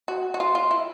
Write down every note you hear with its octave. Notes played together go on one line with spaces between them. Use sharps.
F#4
F#4
F4
F4
E4